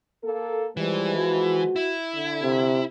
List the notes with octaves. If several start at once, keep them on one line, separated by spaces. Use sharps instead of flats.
A#3 A4
E3 F3 G3 G#3 B4
F#4
E4
D3
C3